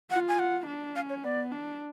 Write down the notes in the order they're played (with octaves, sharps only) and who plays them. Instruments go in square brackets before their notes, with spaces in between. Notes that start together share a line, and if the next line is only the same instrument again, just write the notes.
[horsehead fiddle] F4 [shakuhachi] F#5
[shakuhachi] G#5
F#5
[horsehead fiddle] D4
[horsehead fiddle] C#4 [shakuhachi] F5
[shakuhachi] C#5
[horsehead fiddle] B3 [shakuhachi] D5
[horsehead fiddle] D4